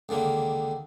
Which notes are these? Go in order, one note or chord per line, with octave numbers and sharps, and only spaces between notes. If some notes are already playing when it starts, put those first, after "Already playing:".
C#2 D3 D#3 A#3